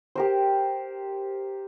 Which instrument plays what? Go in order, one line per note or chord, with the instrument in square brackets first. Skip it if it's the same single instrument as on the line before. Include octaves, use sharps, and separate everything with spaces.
[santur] G4 A#4 C5